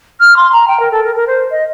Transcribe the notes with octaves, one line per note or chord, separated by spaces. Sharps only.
F6
C6
A#5
G5
A#4
A4
A#4
A#4
C5
D#5